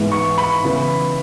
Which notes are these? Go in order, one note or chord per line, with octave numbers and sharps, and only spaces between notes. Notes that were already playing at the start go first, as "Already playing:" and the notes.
Already playing: G#2 E3 G#3 B3
C#6
B5
C#3 E3 B3